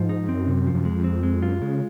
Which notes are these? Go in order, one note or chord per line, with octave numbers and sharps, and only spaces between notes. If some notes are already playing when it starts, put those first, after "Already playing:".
Already playing: G#2 F3
D#4
F#2 C4
C3
F3
F#2
F2 G#3
C4
G#3
F#2 F4
C#3 G#3